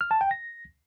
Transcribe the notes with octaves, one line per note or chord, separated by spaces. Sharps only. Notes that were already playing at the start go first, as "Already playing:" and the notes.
F6
A5
G5
A#6